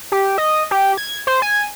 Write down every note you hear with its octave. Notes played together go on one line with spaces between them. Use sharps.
G4
D#5
G4
G#6
C5
G#5